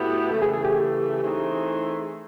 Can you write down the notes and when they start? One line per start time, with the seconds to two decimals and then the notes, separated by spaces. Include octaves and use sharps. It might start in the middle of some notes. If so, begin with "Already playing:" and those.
Already playing: A2 F#3 B3 E4 G4
0.30 C#3 E3 A3 A4
0.42 G#4
0.53 G#4
0.65 G4
1.22 E3 A3 C4 D#4 G#4